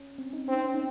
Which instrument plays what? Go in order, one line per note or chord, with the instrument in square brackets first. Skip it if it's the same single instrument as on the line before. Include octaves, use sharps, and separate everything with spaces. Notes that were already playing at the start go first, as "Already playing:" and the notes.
Already playing: [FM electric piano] C#4
C4
D#4
[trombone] C4 [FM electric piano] C#4
[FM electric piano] D#4
C#4
D#4